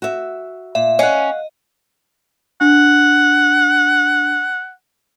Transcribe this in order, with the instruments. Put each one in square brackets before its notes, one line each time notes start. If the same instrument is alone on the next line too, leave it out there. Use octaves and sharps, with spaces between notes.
[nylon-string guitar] F#4 E5
[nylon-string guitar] A#2 [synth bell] E5
[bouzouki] C#4 [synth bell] D#5 [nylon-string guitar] F5 F#5
[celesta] D4 [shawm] F#5